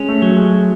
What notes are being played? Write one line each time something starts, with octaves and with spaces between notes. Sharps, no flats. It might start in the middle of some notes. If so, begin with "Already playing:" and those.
Already playing: G#3 C#4
A3
F#3
G#3